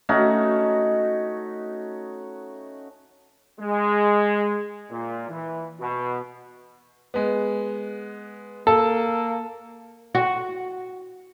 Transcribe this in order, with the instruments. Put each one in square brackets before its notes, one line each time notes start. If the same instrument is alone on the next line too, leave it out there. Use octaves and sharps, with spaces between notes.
[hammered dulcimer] A3 C#4 D#4 F#4
[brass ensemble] G#3
A#2
E3
B2
[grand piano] G#3 B3
[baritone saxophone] A#3 [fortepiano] A4
[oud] F#4